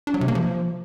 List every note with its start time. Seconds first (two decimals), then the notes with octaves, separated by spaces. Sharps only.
0.07 D4
0.14 F#3
0.21 C3
0.28 A#3
0.35 F3